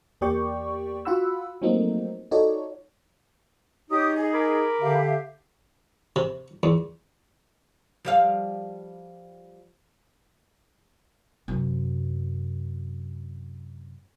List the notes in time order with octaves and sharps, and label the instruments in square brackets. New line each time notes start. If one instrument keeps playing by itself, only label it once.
[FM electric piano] E2 A#3 G4 D5 G5 C#6
F4 F#4 F#5 B5 E6
F3 F#3 A3 A#3 C4 D#4
D#4 F4 F#4 A4 C#5 D5
[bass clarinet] D#4 [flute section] G4 C#5 D#6
[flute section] G#4
[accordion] A#4 B5 D6
[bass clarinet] D3 [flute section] G4 E5 F5
[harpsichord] C3
E2
[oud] F3 G3 F5
[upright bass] F#2 C3